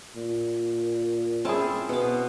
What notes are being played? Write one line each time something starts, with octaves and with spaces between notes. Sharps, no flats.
A#2
C4 C#4 E4 G#4 A5
B2 D6